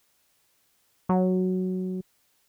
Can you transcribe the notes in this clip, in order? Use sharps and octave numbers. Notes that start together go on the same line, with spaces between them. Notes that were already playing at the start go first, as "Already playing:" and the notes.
F#3